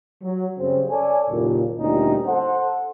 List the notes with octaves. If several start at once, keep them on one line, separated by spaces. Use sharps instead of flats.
F#3
F#2 C#3 G3 C4
A4 C#5 D5 G#5
F#1 D#2 A#2
D2 A#2 G3 C#4 D#4
A4 C5 F#5